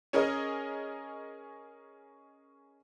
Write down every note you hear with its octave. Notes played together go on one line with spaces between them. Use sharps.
C#4 G#4 A#4 D#5